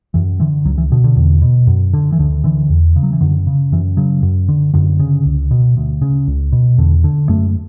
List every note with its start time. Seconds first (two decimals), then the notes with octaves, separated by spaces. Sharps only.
0.14 F#2 E3
0.40 D3 E3
0.65 C#2 F#3
0.78 E3
0.92 B2 D3
1.04 D3
1.16 E2
1.42 B2
1.67 F#2
1.93 D3
2.12 E3
2.19 D2 D3
2.44 D3 E3
2.70 E2
2.96 C#3
3.03 F#3
3.12 E3
3.21 F#2 D3
3.47 C#3
3.72 F#2 E3
3.97 C#3 F#3
4.23 F#2
4.49 D3
4.74 F#2 D3
4.99 C#3
5.25 C#2
5.51 B2
5.77 D2
6.02 C#3
6.27 C#2
6.52 B2
6.78 E2 D3
7.04 D3
7.29 F#2 A3